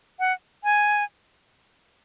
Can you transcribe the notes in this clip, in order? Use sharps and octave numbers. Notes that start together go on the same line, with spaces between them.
F#5
G#5